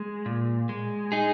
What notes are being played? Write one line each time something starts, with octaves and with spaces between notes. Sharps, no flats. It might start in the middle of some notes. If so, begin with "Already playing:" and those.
Already playing: G#3
A#2
G#3
D#4 G#4